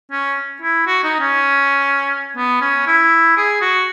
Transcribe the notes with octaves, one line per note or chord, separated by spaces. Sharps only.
C#4
E4
F#4
D#4
C#4
B3
C#4
E4
G#4
F#4